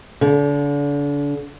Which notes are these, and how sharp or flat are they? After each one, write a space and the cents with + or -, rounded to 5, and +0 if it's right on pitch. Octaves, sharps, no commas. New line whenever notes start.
D3 -35